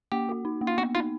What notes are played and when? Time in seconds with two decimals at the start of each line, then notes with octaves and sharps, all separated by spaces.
0.12 A#3 G4
0.29 F#4
0.45 D#4
0.61 A#3
0.67 F4
0.78 B3 F#4
0.95 D#4 F4